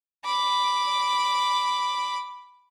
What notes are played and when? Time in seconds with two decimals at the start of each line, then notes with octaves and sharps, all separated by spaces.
0.25 B5 D6